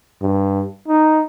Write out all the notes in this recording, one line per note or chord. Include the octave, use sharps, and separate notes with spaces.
G2
D#4